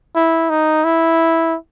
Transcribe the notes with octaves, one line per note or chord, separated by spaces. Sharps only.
E4
D#4
E4